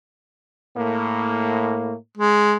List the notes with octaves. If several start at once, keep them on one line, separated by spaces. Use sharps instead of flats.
A2 A#3
G#3